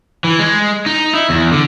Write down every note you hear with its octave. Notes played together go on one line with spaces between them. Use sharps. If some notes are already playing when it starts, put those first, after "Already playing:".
E3
G#3
D#4
E4
E2
D3